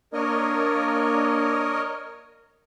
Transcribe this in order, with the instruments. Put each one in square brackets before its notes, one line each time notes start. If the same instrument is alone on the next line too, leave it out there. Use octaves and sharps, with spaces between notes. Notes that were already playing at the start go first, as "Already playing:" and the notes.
[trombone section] A#3 D4 [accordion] A#4 C#5 D#5